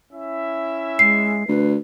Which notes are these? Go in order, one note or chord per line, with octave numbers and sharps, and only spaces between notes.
C#4 E4 E5
G#3 C7
D2 B4